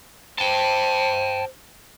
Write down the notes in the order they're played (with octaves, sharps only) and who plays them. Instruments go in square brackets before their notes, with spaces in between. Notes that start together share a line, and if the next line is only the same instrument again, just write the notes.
[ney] C5 [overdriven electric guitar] G5 A5